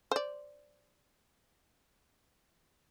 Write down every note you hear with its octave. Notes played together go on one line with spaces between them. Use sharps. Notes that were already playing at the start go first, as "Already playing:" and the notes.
C5 D5